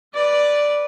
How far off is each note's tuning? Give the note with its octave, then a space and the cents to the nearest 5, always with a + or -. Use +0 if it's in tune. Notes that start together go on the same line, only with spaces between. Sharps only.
B4 -10 D5 +0